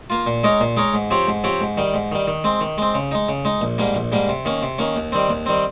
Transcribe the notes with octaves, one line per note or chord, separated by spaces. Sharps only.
A#3 F4
A#2
G#3 D#4 A#4 C#5
A#2
G#3 D#4 A#4 C#5
G#2
F3 C4 G4 C#5
G#2
F3 C4 G4 C#5
G#2
D#3 G3
G#2
D#3 G3
D#3
G#3 C4
D#3
G#3 C4
C#3
G#3 D#4
C#3
G#3 D#4
A#1
G#2 G3 A#3
A#1
G#2 G3 A#3
C3
D#3 A#3 C#4
C3
D#3 A#3 C#4
D#2
D#3 G3 C4
D#2
D#3 G3 C4